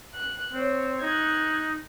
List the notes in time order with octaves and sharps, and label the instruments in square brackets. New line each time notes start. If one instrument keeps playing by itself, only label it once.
[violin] F#6
[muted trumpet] C4 [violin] C5 C#5
[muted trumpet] D#4 [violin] F#6 G#6